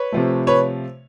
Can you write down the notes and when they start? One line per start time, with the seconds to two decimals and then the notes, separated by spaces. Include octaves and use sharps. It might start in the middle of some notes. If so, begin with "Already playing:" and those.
Already playing: B4 C#5
0.12 C3 F3 A3
0.47 B4 C#5